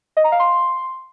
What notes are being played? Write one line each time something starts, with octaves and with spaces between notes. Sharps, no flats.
D#5
A#5
F5
C6